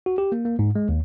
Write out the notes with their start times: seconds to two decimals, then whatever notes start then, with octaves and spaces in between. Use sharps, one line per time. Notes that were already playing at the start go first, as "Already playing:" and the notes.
0.06 F#4
0.18 G4
0.32 A#3
0.45 A#3
0.59 G#2
0.76 G#3
0.89 D#2